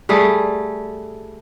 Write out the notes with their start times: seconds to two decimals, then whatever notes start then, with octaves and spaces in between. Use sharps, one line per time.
0.09 G3 A3 G#4